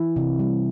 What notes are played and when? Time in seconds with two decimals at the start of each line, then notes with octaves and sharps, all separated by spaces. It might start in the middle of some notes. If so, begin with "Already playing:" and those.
Already playing: E3 E4
0.16 C3
0.39 G3